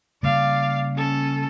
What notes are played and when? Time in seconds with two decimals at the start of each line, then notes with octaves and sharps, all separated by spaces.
0.23 C#3 G3 A#3 D5 F5
0.96 C#4 A4